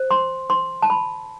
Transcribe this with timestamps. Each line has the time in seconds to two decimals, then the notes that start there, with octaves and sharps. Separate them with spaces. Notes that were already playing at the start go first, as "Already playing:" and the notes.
Already playing: C5
0.11 C6
0.50 C6
0.82 A5
0.90 B5